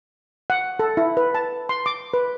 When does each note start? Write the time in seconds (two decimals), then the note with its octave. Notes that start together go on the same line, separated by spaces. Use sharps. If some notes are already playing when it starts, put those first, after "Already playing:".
0.50 F#5
0.79 A4
0.97 E4
1.17 B4
1.35 A5
1.69 C6
1.86 D6
2.14 B4